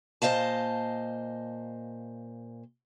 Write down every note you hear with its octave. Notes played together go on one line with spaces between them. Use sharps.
A#2 C5 D#5 F5 A5